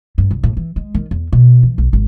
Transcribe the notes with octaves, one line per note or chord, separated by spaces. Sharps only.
G2
C2
A2
E3
G#3
D#3
E2
B2
E3
B1
G#1